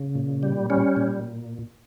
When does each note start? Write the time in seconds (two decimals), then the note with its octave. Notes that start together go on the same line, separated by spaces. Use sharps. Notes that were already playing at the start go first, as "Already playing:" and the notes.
Already playing: C#3
0.15 A#2
0.43 G3
0.70 G3 C#4
0.96 A#2